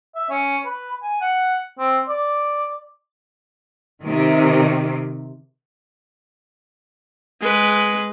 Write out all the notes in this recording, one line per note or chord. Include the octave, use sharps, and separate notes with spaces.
E5
C#4
B4
G#5
F#5
C4
D5
C3 D#3
G#3 B4